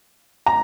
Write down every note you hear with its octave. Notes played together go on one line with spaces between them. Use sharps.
A#5